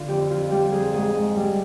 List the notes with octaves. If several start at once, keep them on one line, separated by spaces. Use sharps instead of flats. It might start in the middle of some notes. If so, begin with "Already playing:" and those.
Already playing: D3 F4
F2 G4
F2 F4
G3 G4
F2 G#4
G#2 G#4
G#2
G3